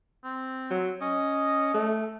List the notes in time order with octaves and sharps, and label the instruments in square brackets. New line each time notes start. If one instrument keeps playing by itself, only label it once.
[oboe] C4
[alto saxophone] F#3
[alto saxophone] C#4 [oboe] D#5
[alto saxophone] A3